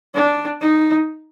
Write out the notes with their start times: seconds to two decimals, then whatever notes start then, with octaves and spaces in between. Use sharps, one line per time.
0.14 D4
0.61 D#4